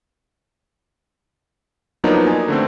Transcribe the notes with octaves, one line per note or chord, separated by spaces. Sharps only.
F3 F#3 A#3 B3 D4 D#4
G#5
D3 A3 C4